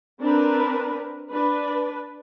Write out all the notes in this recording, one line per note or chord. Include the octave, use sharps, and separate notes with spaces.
C4 D4 A#4 B4
D4 B4